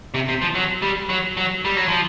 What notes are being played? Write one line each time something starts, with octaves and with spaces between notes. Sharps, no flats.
C3
C3
F3
F#3
G3
F#3
F#3
G3
F#3
F3